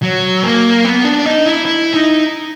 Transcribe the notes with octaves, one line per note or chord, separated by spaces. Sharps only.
F#3
A#3
B3
D4
D#4
E4
E4
D#4